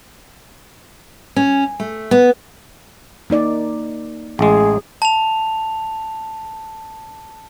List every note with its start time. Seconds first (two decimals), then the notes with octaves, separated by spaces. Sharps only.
1.36 C#4
1.80 A3
2.11 B3
3.30 A#3 D#4 D5
4.39 A1 G#3 G#4
5.02 A5 F7